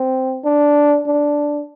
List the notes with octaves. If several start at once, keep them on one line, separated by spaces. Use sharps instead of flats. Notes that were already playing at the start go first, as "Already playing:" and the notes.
Already playing: C4
D4
D4